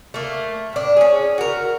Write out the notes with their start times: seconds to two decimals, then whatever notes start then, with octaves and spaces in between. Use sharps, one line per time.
0.14 A3 A#3
0.73 A2 D4
0.97 C#4 G#4
1.38 F#4 A#4